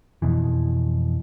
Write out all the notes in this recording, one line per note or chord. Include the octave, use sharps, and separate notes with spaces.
F2 B2 E3